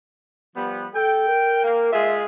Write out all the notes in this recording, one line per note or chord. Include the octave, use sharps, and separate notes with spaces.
F3 G3 B3
A4 G5
A#4
A#3
G#3 F4 G#4 E5